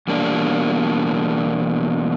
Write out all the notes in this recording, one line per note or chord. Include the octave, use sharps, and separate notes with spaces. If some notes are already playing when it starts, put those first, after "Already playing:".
E2 B2 G3 A#3 D4